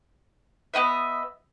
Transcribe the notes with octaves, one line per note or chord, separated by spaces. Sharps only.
B3 C4 D#5 E5